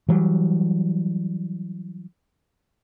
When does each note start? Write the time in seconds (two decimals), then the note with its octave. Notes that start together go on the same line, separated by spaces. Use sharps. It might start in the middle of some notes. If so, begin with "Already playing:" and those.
0.09 E3 F#3 G3